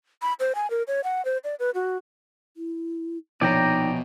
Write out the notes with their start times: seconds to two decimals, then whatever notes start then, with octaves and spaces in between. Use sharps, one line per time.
0.22 B5
0.40 C5
0.55 G#5
0.70 A#4
0.88 C#5
1.04 F#5
1.25 C5
1.44 D5
1.59 B4
1.75 F#4
2.57 E4
3.41 A#1 B2 D#4 C#5 D5 G5 A#5